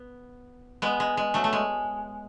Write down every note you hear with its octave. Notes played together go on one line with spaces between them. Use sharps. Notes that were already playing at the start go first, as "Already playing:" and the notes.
Already playing: B3
G#3 B3
G#3
G#3
F#3 A3
A3
G#3